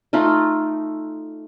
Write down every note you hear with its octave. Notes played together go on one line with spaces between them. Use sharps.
A3 D#4 F4